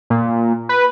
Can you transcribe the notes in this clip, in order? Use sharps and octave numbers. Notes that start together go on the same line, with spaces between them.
A#2
B4